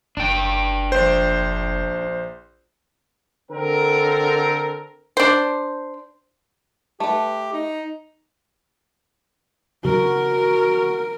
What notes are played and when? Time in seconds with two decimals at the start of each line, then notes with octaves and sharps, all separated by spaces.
0.17 F#1 D4 G5
0.92 A#1 C5
3.51 D3 C4 A4 A#4
5.17 D4 C5
7.00 A3 G4 B4
7.53 D#4
9.85 C#3 F#3 D4 F#4 A#4